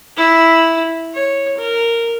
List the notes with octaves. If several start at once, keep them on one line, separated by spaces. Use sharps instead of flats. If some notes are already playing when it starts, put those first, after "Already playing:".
E4
C#5
A#4